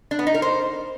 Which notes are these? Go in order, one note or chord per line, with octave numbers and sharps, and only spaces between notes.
D4
B3
D#4
A#4
C5